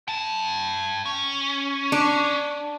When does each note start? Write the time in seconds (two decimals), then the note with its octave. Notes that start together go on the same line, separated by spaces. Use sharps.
0.08 G5 A5
1.05 C#4
1.92 D4